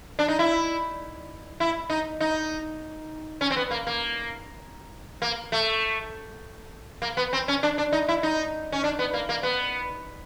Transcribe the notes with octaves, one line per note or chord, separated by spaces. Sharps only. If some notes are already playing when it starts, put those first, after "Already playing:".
D4
D#4
E4
E4
D#4
D#4
C#4
C4
B3
A#3
A#3
A#3
A3
A#3
B3
C4
C#4
D4
D4
D#4
E4
D#4
C#4
D4
B3
A#3
A#3
B3